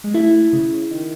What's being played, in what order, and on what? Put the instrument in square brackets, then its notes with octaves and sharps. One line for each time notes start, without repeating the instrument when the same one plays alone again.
[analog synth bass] G#3
[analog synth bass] A3 [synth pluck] E4
[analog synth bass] C#3
D#3